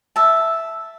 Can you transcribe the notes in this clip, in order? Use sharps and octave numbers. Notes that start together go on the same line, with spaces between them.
E5 A5